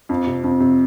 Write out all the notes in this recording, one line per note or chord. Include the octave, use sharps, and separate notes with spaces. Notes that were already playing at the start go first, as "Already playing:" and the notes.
F2
C3
F2
C3